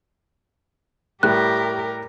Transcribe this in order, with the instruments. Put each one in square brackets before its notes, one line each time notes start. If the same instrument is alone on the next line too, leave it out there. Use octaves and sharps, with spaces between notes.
[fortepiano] A2 G3 [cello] G4 A#4 [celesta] F#6